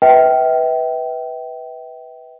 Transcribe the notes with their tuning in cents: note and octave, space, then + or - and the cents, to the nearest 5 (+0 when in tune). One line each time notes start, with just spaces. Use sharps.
B4 +0 E5 -35 G5 -20